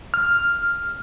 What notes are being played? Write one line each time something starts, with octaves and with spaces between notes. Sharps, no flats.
F6